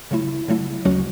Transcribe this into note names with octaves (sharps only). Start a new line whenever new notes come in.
C#3 F#3 A3 E4
C#3 F#3 A3 E4
D2 C#3 F#3 C#4 F#4